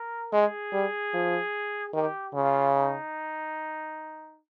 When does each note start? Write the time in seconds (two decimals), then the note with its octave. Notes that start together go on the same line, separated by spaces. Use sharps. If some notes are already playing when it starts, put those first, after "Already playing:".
Already playing: A#4
0.32 G#3 G#4
0.73 G3
1.13 F3
1.94 D#3 G4
2.34 C#3 F4
2.74 D#4